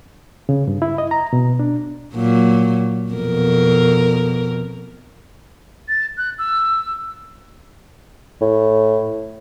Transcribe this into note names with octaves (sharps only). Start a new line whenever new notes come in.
C#3
G2
E4
D#5
A#5
B2
D4
A#2 F#3
F2 B2 A#4
A6
F#6
E6
A2